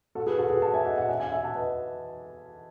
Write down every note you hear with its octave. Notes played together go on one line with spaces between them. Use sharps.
F#4 A4
G#4 B4
F#4 A4
G#4 B4
F#5 A5
E5 G#5
D#5 F#5
D#5 F#5
E5 G#5
E5 G#5
E5 G#5
F#5 A5
B4 D#5